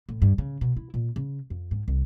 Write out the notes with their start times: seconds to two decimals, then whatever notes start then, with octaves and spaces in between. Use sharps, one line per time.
0.09 A2
0.22 G2
0.38 C#3
0.61 B2
0.77 E4
0.94 A#2
1.16 C#3
1.50 F2
1.71 G#2
1.88 C2